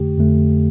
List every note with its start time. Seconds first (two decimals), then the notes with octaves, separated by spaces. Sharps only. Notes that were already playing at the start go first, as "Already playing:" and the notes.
Already playing: F2 D3 A3 G4
0.18 F2 D3 A3